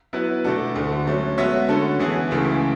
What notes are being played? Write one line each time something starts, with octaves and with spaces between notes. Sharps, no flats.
F#3 B3 E4 B4
B2 A3 D4 F#4 A4
D2 D3 A3
F#3 A3 C#4
G#3 B3 F#4 C#5 E5
D3 A3 C#4 F#4 A4
E3 B3 E4 G#4
C#2 C#3 E3 A3